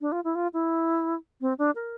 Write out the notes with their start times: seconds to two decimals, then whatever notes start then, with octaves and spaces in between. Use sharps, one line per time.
0.01 D4
0.12 F4
0.24 E4
0.35 F4
0.53 E4
1.41 C4
1.58 D4
1.75 A#4